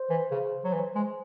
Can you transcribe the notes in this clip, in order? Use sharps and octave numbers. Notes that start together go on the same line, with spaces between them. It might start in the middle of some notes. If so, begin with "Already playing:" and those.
Already playing: C5
E3
C#3
F#3
E3
G#3